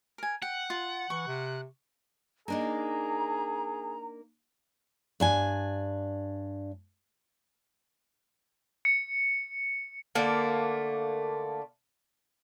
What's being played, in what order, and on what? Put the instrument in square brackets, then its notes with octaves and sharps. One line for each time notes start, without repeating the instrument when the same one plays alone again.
[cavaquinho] A#4 G#5
[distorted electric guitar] F#5 [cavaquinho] G5
[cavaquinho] F4
[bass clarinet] E3 [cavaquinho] C#6
[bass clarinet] C3
[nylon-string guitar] A#3 D4 D#4 [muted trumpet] G#4 [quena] A#5
[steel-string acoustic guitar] G2 D4 G#5
[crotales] C#7
[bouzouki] D3 A3 A#3